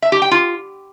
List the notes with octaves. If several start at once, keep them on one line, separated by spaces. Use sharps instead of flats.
E5
G4
G5
F4